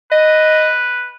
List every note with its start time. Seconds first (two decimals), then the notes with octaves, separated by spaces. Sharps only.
0.11 B4 D#5